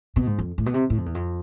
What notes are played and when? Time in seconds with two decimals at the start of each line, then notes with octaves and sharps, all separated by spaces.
0.16 B2
0.27 G#2
0.39 F2
0.58 A2
0.66 B2
0.74 C3
0.90 A2
0.98 F2
1.06 E2
1.15 F2